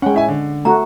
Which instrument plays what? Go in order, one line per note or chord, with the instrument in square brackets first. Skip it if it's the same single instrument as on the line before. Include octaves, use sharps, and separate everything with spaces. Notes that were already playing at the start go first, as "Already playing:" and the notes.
[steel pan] G#3 C#4 [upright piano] F#5 G5
[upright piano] A2 E5 G#5
D3
[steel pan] A3 F#4 [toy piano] A#5